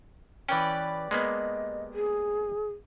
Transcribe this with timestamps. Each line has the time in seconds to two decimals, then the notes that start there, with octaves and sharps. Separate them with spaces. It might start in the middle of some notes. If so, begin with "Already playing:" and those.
0.48 E3 C#4 G4 B4 D5
1.11 G#3 A#3 B3 D#5
1.94 G#4